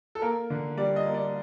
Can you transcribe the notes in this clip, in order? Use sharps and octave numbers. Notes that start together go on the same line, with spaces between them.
A4
A#3 A#4
D3
G3 D5
D#5
A#3
D5